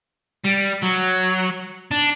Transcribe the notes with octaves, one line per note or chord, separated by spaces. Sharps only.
G3
F#3
D4